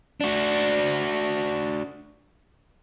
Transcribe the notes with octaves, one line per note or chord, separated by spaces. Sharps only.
D4 F#4